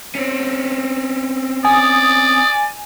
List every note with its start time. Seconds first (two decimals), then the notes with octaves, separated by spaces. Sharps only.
0.15 C4 C#4
1.65 D5 G#5 D#6